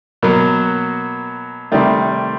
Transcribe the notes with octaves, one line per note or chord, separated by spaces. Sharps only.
B2 F#3 A#3
C3 D#3 G3 A3